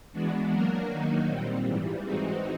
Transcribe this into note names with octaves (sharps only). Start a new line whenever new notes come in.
E3 G#3 B3 D4 F#4
F#3 A#3 D4 F#4 A#4
D#3 F#3 A#3 D#4 F#4
A#2 G3 C4
G#2 E3 G3
E3 G#3 C4 D#4 F#4